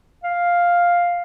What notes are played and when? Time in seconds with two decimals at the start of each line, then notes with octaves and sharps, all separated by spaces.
0.24 F5